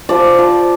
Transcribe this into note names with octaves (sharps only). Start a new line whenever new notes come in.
F3 D5
F3